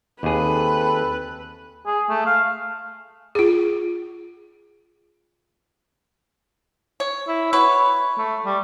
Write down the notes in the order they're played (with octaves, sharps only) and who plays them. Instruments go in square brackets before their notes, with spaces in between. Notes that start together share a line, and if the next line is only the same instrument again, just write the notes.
[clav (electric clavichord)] D#2 G#4 [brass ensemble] C4 A4 [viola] B4
[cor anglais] G#4
A3
F5
[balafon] F4 G#4
[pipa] C#5
[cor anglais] E4
[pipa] E4 F#4 B4 [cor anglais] C#5
[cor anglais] A3
G3